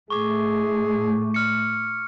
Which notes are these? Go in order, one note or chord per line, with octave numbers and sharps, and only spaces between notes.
A2 A3 G#4 C#6 D6
F6 C#7